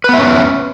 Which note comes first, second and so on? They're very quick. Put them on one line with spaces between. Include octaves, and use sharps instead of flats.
B4 B3 E5 C#4